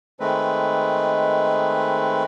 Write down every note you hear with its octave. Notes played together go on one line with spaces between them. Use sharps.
D#3 G#3 A3 C4 B4